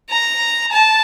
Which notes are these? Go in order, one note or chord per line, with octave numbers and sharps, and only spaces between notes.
A#5
A5